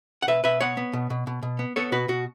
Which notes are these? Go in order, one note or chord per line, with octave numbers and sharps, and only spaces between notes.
F#5
B2 B4 E5
B2 B4 E5
B3 C#5 F#5
B3
B2
B2
B2
B2
B3
B3 A4 C#5
B2 F#4 B4
B2 F#4